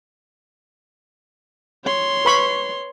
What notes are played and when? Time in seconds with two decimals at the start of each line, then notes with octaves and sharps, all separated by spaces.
1.85 C#5 C6
2.25 B4 B5 C#6